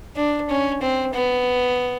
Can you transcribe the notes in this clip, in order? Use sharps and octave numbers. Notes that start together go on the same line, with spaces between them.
D4
C#4
C4
B3